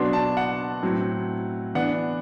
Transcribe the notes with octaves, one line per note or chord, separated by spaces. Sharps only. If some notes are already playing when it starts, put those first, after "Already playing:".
Already playing: B2 F#3 B3 D4 C6
A5
F#5
A2 F#3 C4
E3 B3 D4 F#5